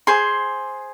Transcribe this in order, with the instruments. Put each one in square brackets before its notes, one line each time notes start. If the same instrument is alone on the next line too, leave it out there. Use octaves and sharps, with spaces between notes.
[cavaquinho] G#4 C5 C6